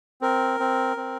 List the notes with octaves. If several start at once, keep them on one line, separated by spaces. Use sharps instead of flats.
C4 A#4
C4
C4